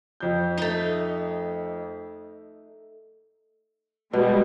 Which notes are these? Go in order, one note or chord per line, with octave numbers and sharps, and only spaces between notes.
F2 G6
A3 D#4
B2 G3 G#3